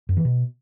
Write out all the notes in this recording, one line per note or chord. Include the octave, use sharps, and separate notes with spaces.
F#2
E3
B2